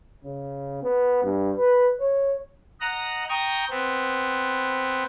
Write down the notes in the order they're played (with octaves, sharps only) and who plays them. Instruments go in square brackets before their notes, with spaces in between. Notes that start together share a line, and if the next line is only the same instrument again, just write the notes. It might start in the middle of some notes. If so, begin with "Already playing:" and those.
[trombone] C#3
B3
G2
B4
C#5
[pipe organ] D#5 F#5 A#5
G5 A#5 C#6 D#6
B3 C4